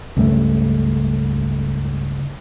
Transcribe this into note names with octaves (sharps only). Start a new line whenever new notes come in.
C#2 G2 A3